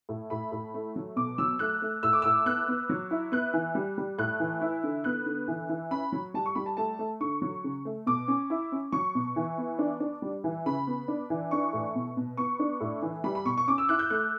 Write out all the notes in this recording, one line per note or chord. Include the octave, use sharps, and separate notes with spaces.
A2
A2 B5
A2
A3
F#3
B2 D6
F#3 E6
A3 F#6
A3
A2 E6
D6
A2 E6
B3 F#6
B3
F#3
E4
B3 F#6
E3
G3
G3
A2 F#6
E3
E4
D3
B3 F#6
D3
E3
E3
C#4 B5
F#3
G3 A5
C#6
G3 B5
A5
A3 A5
A3
D3 C#6
F#3
C#3
A3
B2 D6
C#4
E4
C#4
F#3 C#6
B2
E3
B3
D4
D4
G3
E3
C#3 B5
B3
D4
E3
D4 C#6
A2
B2
B2
B3 C#6
D4
A2
E3
G3 B5
B5
B2 C#6
C#6
C#4 D6
E6
E4 F#6
G6
A3 F#6